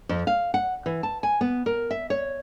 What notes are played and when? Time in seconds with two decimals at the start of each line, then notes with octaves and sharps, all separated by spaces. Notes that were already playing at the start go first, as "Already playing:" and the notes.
0.09 F2
0.27 F5
0.54 F#5
0.86 E3
1.03 A5
1.23 G#5
1.41 B3
1.66 A#4
1.91 E5
2.10 C#5